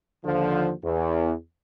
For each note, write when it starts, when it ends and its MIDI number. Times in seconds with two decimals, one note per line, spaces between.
0.25 0.71 39
0.25 0.71 50
0.25 0.71 53
0.83 1.32 40